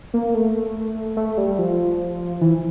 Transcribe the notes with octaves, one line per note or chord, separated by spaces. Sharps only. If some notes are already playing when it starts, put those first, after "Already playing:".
A#3
A3
A3
G3
F3
E3